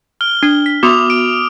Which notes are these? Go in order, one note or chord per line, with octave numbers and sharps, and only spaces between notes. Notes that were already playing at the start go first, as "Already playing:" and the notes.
F6 G7
D4
B6
B3 F#4 D6 D#6 F7
D7